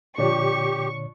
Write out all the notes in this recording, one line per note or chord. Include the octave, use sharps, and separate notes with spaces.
A#2 D3 F3 D4 G4 C#5 C#6